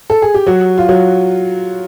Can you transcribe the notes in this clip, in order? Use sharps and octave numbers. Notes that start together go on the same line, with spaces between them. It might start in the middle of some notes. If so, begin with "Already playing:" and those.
A4
G#4
G4
F#3 F#4
F4
F#3 F#4